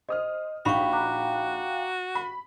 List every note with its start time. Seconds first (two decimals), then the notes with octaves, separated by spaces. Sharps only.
0.09 C5 D#5 D#6 F6
0.65 A#1 D#4 F#4 F5 G5 B5 C#6
0.93 A#5 D6 F#6
2.15 B5